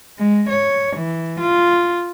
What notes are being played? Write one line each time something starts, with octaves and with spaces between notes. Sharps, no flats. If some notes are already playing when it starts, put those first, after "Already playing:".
G#3
C#5
E3
F4